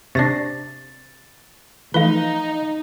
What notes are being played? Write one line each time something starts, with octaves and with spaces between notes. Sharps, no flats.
C3 D4 C#6 A6 A#6 C7
E3 F3 A3 D#4 B4 F5 G7